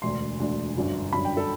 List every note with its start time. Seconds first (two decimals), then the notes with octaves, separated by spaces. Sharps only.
0.02 E1 D2 D3 C6
0.39 E1 D2 D3
0.76 G1 F#2 D3
1.12 G1 F#2 D3 B5
1.25 G5
1.37 A4